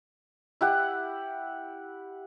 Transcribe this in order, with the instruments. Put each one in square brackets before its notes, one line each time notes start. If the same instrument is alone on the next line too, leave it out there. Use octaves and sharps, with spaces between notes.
[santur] E4 G4 F#5